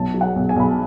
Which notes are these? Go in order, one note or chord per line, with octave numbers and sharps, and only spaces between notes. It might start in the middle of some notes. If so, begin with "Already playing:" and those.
Already playing: B1 A5
F#3
F#5
B1
G#5
B1 B5
A5